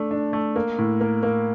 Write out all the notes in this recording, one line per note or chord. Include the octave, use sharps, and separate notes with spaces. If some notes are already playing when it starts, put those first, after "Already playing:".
Already playing: A3 D4
D4
A3
A#3
A2
A#3
A#3